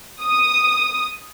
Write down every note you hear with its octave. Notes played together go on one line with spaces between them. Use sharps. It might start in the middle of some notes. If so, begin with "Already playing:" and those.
D#6